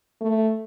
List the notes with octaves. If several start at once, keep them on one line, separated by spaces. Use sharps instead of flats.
A3